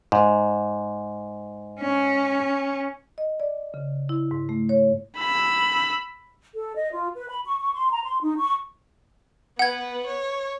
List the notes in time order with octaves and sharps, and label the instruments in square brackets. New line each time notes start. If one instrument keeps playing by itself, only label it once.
[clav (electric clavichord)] G#2
[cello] C#4
[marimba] D#5
D5
C#3
E4
G#2
A3
C#5
[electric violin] B5 E6
[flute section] A4
D#5
F4
B4
B5
C#6
C#6
C6
A#5
C6
D#4
C#6
[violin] B3 B4 [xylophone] F#5 G#6
[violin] C#5